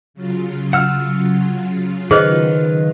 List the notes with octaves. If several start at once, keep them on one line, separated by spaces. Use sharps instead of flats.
C#3 F#3 F4
F#5 E6 F6
D#3 G#4 B4 C5 D#5 F6